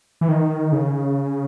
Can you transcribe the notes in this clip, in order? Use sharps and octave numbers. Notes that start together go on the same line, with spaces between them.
E3
D#3
C#3